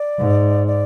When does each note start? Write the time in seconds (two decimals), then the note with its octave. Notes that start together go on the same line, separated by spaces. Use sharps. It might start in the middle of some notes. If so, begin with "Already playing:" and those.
Already playing: D5
0.19 G#2
0.67 D5